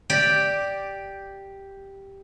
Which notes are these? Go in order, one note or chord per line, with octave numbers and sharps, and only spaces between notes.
G4 D5